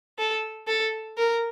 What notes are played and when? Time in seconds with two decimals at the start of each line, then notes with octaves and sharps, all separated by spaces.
0.18 A4
0.67 A4
1.17 A#4